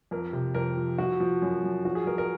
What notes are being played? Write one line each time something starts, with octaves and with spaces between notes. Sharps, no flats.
F2 A#4
C3
F2 A#4
F3
F3 F#4
F3
F#2
F#2
F3 F#4
G#4
F3 A#4
A#4